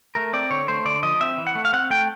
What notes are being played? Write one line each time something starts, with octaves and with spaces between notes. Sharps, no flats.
A3 A#4
C4 D5
D3 C#5
A3 C5
D3 D5
F3 D#5
C4 E5
E3
F#5
A3
F5
C4 F#5
A3 G5